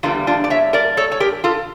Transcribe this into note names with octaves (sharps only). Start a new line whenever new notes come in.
E2 D3 G3 A#3 D4 F4
D4 F4
D5
C#5 E5
A#4 D5
A4 C#5
C#5
G4 A#4
F4 A4